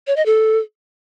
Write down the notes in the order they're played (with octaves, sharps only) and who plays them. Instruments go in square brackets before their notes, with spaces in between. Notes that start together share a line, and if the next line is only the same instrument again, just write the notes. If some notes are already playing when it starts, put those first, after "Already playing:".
[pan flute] C#5
D#5
A4